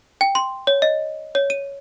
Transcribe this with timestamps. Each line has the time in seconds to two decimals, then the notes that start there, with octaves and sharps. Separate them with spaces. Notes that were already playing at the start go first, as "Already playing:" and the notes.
0.21 G5
0.35 C6
0.67 C#5
0.82 D#5
1.35 C#5
1.50 D#7